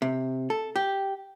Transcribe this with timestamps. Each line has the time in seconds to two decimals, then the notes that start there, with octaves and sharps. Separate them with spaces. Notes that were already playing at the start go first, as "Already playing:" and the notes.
0.02 C3
0.50 A4
0.76 G4